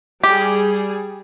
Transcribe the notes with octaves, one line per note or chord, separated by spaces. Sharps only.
G3 G4 G#4